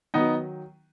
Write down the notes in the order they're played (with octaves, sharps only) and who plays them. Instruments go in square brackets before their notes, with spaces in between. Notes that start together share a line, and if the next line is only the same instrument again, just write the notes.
[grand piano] D#3 F#3 B3 D#4